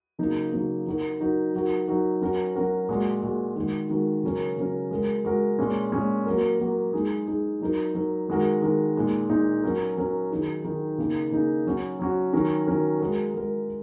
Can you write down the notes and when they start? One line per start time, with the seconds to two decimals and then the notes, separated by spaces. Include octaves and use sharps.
0.19 C#3 F#3 A#3 D#4
0.53 C#3 F#3 A#3 D#4
0.86 F#3 D#4 F#4 A#4
1.20 F#3 D#4 F#4 A#4
1.54 F#3 D#4 F#4 A#4
1.88 F#3 D#4 F#4 A#4
2.21 F#3 C#4 F#4 A#4
2.55 F#3 C#4 F#4 A#4
2.89 A#2 G#3 F#4
3.23 A#2 G#3 F#4
3.56 D#3 G#3 F#4 A#4
3.90 D#3 G#3 F#4 A#4
4.23 C#3 F#3 C#4 A#4
4.57 C#3 F#3 C#4 A#4
4.91 G#3 F#4 A#4
5.25 G#3 F#4 A#4
5.59 A#2 G#3 C#4
5.92 A#2 G#3 C#4
6.26 F#3 A#3 F#4 A#4
6.60 F#3 A#3 F#4 A#4
6.93 G#3 D#4 G#4
7.27 G#3 D#4 G#4
7.61 F#3 D#4 A#4
7.95 F#3 D#4 A#4
8.28 D#3 G#3 F#4 A#4
8.62 D#3 G#3 F#4 A#4
8.96 A#2 G#3 D#4
9.29 A#2 G#3 D#4
9.63 F#3 C#4 F#4 A#4
9.97 F#3 C#4 F#4 A#4
10.30 D#3 F#3 D#4 G#4
10.64 D#3 F#3 D#4 G#4
10.98 C#3 A#3 D#4 G#4
11.32 C#3 A#3 D#4 G#4
11.66 F#3 C#4 F#4
11.99 F#3 C#4 F#4
12.33 D#3 F#3 C#4 A#4
12.67 D#3 F#3 C#4 A#4
13.00 G#3 F#4 A#4
13.34 G#3 F#4 A#4